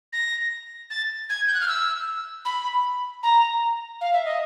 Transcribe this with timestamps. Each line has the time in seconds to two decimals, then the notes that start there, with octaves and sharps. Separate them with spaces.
0.13 A#6
0.90 A6
1.29 G#6
1.47 G6
1.54 F#6
1.61 F6
1.68 E6
2.45 B5
3.23 A#5
4.01 F5
4.13 E5
4.25 D#5